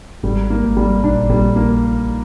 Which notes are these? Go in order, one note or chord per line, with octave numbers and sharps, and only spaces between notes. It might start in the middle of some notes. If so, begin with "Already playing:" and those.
G#1 G#2 G3
A#3
G#1 G#2
G3
A#1 A#2 D4
A#1 A#2 G3
A#3